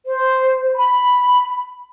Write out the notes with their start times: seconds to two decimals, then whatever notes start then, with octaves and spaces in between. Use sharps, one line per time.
0.06 C5
0.75 B5